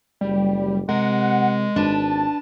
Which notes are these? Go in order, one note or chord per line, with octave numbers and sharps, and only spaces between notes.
F#1 G3
C3 G#3 A#4 F#5
G#1 D4 B4 A5